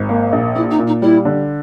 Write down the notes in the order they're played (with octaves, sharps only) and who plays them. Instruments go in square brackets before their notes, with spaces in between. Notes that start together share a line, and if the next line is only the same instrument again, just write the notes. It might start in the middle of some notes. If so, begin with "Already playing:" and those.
Already playing: [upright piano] G#1
A#3
A#1
[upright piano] A#2 [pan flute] E4
[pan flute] D#4
[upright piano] A#2
[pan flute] D#4
[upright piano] G3 [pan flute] E4
[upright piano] D3